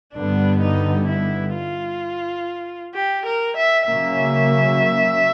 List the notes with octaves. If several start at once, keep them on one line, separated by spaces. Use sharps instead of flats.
G2 D3 G3 B3 D4
D#4
E4
F4
G4
A#4
E5
C#3 F#3 A#3 C#4 E5